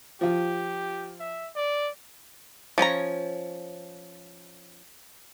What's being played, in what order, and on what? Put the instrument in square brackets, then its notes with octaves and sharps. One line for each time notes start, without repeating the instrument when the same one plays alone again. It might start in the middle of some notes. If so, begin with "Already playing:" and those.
[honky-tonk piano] F3 F4 [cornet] G4
[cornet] E5
D5
[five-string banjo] F3 C#4 C#5 A#5